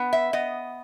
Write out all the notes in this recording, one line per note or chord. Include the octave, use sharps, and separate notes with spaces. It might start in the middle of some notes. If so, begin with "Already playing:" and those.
Already playing: B3
E5
B3 D#5